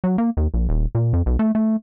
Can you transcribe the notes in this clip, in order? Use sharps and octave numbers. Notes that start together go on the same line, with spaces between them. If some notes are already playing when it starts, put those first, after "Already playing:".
F#3
A#3
D#2
A#1
D#1
A#2
F2
B1
A3
A3